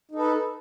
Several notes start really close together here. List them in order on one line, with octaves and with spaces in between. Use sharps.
D#4 A4 B4